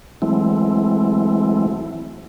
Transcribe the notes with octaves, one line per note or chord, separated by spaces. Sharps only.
E3 F#3 G#3 A3 C4 E4